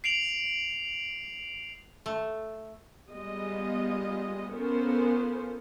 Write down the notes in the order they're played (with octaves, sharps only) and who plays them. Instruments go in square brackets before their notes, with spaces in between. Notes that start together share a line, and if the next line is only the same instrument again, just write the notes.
[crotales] C7 D7 F7 F#7
[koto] A3
[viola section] G3 G#3 B3 F4 D#5
B3 C#4 F4 A4 A#4 C5